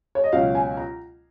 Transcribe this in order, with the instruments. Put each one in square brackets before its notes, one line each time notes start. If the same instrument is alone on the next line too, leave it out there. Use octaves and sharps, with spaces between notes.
[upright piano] C#5
D#5
C#2 B2 F#3 C#4 F5
G#5
A#5